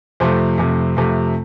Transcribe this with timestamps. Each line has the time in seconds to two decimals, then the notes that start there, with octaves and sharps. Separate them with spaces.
0.20 F2 C3 A3 C5
0.58 F2 C3 A3
0.97 F2 C3 A3